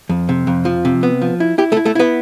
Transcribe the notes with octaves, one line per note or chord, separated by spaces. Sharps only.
F2
C3
F2
F3
C3
B3
F3
E4
E4 G4
A3 A4
E4
A3 A4
B3 E4 B4